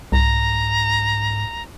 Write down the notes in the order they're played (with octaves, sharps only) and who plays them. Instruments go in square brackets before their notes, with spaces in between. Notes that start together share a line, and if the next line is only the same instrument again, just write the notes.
[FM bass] C2 [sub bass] G#2 [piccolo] A#5